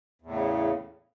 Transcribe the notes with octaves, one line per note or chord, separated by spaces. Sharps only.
E2 A2 C#3